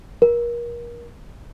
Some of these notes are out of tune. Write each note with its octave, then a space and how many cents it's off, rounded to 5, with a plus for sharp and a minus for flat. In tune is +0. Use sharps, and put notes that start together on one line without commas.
A#4 +30